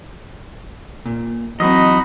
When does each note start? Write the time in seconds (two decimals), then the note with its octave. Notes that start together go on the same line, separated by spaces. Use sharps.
1.06 A#2
1.60 E3 F#3 C4 D#4 F#4 D#5 B5